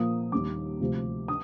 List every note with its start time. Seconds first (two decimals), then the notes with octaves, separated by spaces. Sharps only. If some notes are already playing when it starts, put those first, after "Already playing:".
Already playing: A#2 F3 A#3 D#6
0.32 D#2 D#3 G3 D6
0.80 D2 C3 F3
1.28 D#6